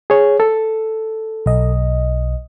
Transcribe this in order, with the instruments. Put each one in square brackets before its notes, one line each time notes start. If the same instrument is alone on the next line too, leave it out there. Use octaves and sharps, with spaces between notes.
[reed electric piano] G#4 C#5
A4
[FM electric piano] B1 D#5